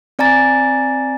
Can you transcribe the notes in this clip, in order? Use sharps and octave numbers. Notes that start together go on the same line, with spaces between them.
C4 D5 G#5 A#5 A6